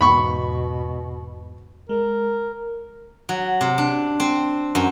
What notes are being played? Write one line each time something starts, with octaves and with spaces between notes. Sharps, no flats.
E2 G#2 B2 B5 C#6
G#3 A#4
F#3
C3
D4
C4
F#2